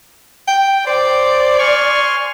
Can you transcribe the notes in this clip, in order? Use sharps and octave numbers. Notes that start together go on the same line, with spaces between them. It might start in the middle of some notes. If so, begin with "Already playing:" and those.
G5
C5 D5
G#5 C6 C#6 F6